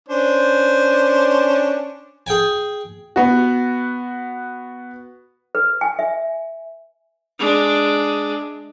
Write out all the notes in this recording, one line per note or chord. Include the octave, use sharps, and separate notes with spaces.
C#4 D4 C5
G#4 G5 G#5
B3 F#4
B4
G#5
E5
G#3 D4